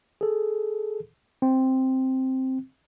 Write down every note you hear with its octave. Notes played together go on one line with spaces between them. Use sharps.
G#4 A4
C4